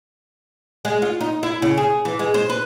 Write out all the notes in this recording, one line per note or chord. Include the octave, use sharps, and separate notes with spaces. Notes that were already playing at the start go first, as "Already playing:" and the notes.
G#3
F4
D#4
E4
C#3
G#4
E3
G#3
C5
B4